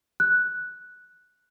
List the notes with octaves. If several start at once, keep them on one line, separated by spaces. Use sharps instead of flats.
F#6